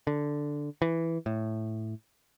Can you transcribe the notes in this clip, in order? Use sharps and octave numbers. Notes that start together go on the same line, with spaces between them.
D3
E3
A2